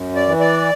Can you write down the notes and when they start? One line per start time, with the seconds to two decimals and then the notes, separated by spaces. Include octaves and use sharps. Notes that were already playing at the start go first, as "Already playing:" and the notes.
Already playing: F#2
0.16 D5
0.28 E3
0.40 D5